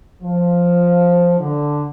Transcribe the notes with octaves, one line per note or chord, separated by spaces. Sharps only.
F3
D3